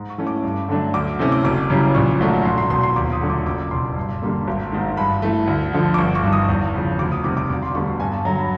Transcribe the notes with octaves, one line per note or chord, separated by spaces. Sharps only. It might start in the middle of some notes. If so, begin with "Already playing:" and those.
Already playing: G#2
C#6
E3 A3 C#4
D6
G2
D3 F#3 A3 D4
D2 D6
C3 E3 A3 C#4
D6
F#1 D6
F#2 C#3 E3 G3
A#1 C#6
G#2 D#3 F#3 A3
E1 C6
C6
E2 B2 C6
C6
D#2 D6
D#6
D3 F#3 A3
D6
F#1 D6
E2 B2 C6
G2
D3 G3 A#3
G#1
G#2 D#3
G2 B5
E3 A3
D2
D3 F3
D6
G1 C#6
C#6
G2 D#3
D#6
E2
C#3 F3
D2 D6
D#6
C3 D#3 G3 D6
D6
E1 D6
C6
D2 D3 G3 B3 C#6
C#6
G2 G#5
A5
D3 F#3 A#5
B5